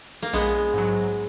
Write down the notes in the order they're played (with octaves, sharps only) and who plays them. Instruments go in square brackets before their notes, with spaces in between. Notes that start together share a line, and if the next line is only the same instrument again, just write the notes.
[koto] A#3
[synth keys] A#1 [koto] G#3 B3
[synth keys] G#2 F#3